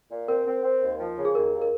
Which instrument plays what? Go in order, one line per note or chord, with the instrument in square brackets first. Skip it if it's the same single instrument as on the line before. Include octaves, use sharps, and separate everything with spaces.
[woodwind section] A#2
[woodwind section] C4 [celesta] A#4
[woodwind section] C4
C4
D#2
F3
C#3
[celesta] G#4
[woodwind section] D#2 [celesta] A#4
[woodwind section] D#2
[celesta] A#4